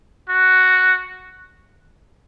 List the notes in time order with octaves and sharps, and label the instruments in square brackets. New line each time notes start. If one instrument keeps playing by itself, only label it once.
[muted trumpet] F#4